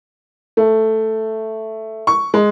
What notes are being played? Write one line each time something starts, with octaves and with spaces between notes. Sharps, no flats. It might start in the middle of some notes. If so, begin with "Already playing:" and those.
A3
C#6
G#3